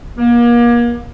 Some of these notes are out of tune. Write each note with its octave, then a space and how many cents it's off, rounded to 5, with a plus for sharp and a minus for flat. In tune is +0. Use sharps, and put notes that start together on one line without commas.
A#3 +35